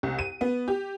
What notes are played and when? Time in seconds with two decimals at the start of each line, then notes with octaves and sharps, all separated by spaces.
0.03 C2
0.19 D#7
0.41 B3
0.68 G4